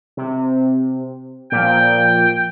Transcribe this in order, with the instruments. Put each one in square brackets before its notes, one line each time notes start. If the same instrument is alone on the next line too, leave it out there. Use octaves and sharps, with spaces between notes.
[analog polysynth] C3
[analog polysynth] A#2 F3 [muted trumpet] G5